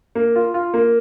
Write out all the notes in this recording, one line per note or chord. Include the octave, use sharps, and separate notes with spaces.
A#3
F4
F4
A#3